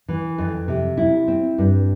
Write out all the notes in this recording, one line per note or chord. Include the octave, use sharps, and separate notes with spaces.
E3
F2
C3
E4
C4
G2